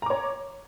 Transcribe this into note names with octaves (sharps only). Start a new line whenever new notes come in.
C#5 A#5 D6